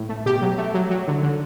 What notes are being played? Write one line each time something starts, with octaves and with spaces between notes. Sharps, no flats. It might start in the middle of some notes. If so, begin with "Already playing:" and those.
Already playing: A2
A3
B2 G4
F#3
A3
F#3
F#3
D3
D3